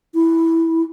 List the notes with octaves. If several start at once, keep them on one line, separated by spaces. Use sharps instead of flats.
E4